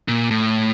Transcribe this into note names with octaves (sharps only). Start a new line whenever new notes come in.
A#2
A2